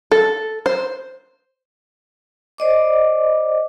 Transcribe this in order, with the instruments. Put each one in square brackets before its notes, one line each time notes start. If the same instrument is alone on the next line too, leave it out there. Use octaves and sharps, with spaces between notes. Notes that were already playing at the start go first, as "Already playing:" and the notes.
[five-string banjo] A4
C5
[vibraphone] C5 D5 D#5 D6